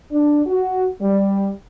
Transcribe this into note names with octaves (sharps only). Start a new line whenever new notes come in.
D4
F#4
G3